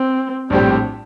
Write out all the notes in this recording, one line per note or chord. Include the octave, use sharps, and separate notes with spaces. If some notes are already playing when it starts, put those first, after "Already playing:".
Already playing: C4
A#1 A2 G3 C4 D4 G4